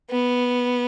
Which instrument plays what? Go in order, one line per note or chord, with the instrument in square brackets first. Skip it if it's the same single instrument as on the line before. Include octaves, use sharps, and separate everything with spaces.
[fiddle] B3